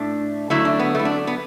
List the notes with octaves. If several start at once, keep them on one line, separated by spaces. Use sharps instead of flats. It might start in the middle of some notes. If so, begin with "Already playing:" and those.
Already playing: A2 A3 D4
D3 F#3 A3 E4
D4
B3
A3 E4
D4
B3